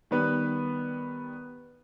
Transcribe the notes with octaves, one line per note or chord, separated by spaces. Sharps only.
D#3 G3 B3 B4